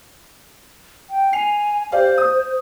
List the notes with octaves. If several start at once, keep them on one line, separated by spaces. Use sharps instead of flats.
G5
G#5 C7 F7
G4 C5 D5 F5
D#6